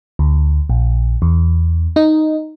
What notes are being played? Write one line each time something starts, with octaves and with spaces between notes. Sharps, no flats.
D2
A#1
E2
D#4